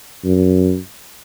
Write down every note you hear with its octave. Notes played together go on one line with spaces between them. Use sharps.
F#2